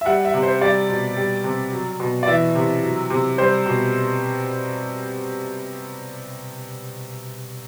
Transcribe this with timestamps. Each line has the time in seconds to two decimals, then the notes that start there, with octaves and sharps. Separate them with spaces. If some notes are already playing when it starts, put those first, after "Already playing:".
0.01 E5
0.06 G3 F#5
0.25 E5
0.34 C3
0.43 C5
0.61 G3 D5
0.89 B2
1.17 G3
1.44 C3
1.72 F#3
2.00 B2
2.23 D5
2.27 E3 E5
2.55 C3
2.83 F#3
3.10 C3
3.38 G3 C5
3.66 B2